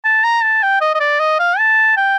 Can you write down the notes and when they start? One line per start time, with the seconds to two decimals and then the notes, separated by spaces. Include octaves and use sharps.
0.05 A5
0.24 A#5
0.43 A5
0.63 G5
0.81 D#5
0.95 D#5
1.00 D5
1.20 D#5
1.39 F5
1.59 A5
1.97 G5